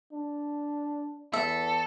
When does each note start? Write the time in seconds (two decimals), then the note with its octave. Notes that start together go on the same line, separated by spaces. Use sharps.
0.12 D4
1.33 E2 A4 E5